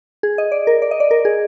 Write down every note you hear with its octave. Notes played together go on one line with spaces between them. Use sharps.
G#4
D#5
D5
A#4
D5
D#5
D5
A#4
G#4